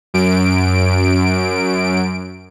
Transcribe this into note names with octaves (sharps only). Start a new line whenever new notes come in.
F#2 D7